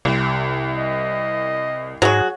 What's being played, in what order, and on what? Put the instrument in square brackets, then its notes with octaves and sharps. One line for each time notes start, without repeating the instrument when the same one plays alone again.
[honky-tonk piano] C2 [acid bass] C3
[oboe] D#5
[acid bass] G#2 [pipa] F#3 F#4 [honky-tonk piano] G#4